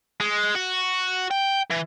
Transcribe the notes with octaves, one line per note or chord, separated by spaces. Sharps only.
G#3
F#4
G5
E3